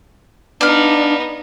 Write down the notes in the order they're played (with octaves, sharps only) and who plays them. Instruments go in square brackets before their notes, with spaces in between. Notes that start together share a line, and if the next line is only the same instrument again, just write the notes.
[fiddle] B3 D#4 [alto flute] D4 [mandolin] D5 F5